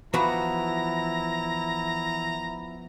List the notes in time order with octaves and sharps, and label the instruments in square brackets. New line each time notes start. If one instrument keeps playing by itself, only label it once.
[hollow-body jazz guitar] E3 F#4 B5 [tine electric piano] F3 B3 F#5 [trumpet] E4 [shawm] A#5